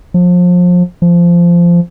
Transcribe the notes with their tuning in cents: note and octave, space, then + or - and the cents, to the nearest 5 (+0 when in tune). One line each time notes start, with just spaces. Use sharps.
F3 +30
F3 -15